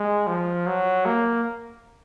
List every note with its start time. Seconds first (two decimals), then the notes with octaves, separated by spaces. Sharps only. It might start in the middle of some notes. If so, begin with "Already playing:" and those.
Already playing: G#3
0.27 F3
0.67 F#3
1.06 A#3